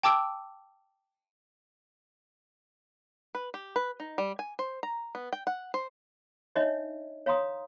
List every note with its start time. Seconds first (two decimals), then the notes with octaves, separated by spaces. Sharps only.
0.03 G5 A5 D6 E6 D7
3.35 B4
3.54 G4
3.76 B4
4.00 D#4
4.18 G3
4.39 G#5
4.59 C5
4.83 A#5
5.15 B3
5.33 G5
5.47 F#5
5.74 C5
6.55 D4 D#4 C#5 D#5 E5
7.26 C#5 F5 A#5 C6 D#6